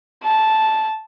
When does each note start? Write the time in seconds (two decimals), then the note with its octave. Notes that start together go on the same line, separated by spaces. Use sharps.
0.23 A5